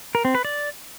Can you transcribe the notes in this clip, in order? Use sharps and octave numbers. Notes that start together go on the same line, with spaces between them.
A#4
C4
B4
D5